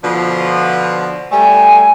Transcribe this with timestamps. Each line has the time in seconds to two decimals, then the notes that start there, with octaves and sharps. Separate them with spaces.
0.04 B2 D3 F3
1.32 G3 A3 G#5